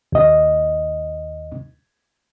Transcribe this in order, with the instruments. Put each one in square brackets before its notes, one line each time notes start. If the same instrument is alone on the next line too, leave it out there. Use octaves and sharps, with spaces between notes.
[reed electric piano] D#2 D#5